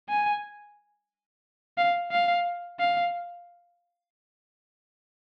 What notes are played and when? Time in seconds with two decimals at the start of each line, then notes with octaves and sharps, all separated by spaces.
0.09 G#5
1.77 F5
2.12 F5
2.79 F5